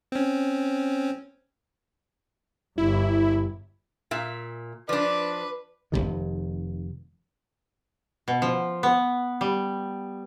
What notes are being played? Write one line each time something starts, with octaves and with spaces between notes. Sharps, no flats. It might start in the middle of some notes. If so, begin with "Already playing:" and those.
C4 C#4
G1 E4
A#2 E5
F3 D4 B4 D5
F1 C#2 C3 D#3
B2
F3
B3
G3